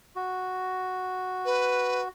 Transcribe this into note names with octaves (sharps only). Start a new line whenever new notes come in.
F#4
B4